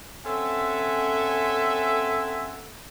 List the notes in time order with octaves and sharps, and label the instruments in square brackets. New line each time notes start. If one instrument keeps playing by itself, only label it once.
[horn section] C4 C#4 A4 E5 F#5 G#5